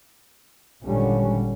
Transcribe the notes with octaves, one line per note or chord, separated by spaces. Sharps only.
G#1 A#2 D3 G3 C#4